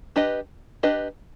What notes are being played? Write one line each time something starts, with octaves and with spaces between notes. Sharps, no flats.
D4 G4 B4 D#5
D4 G4 B4 D#5